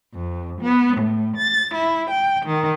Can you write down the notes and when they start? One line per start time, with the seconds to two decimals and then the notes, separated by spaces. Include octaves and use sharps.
0.14 F2
0.62 B3
0.97 A2
1.37 A6
1.75 E4
2.11 G5
2.46 D#3